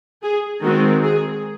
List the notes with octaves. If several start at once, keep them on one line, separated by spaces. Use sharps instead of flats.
G#4
D#3 G#3 C4 F#4
G#4